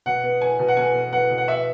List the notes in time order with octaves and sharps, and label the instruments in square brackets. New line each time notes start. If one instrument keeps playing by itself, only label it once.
[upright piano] B2 F#5
B3
B3 G#5
B2
F#5
B2 G#5
B3
B3 F#5
B2
F#5
B3 E5